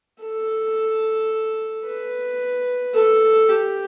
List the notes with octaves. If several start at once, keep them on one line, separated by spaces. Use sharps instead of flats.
A4
B4
A4
G4